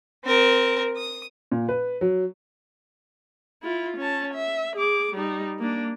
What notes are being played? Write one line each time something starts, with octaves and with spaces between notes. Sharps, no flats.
C4 A#4
D#6
A#2
B4
F#3
E4 F4
C#4 A5
E5
G#4 D6
G3 D#4
A#3 D4